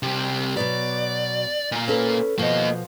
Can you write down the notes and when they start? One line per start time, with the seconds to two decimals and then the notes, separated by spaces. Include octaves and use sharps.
0.03 C3 G3
0.57 B2 F#3 B3 D5
1.72 A#2 A#3
1.88 C#4 A4 B4
2.39 B2 F3 A#3 D#5